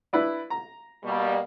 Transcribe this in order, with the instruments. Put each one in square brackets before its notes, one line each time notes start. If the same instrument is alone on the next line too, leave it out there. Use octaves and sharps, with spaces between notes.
[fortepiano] D4 E4 B4
A#5
[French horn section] B2 G3 A#3